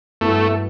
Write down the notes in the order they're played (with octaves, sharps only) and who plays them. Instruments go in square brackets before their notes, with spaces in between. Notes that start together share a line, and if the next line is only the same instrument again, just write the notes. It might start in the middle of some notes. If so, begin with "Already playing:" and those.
[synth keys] G2 F#3 B3 E4 [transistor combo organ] A3